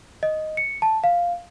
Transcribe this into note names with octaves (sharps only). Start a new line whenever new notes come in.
D#5
C#7
A5
F5